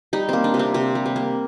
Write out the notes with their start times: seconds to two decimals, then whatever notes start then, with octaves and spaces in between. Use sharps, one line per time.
0.13 G3 D#4
0.29 A#3 C4
0.44 D4
0.54 C3
0.59 C4
0.74 C3 C4
0.95 G3
1.06 C4
1.16 A#3